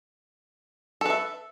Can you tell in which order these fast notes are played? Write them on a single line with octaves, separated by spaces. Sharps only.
A4 B4 E5